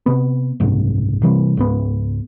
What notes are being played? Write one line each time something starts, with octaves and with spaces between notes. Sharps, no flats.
C3 B3
F#1 C2 G#2
C3 E3 G3
C#2 G#2 B3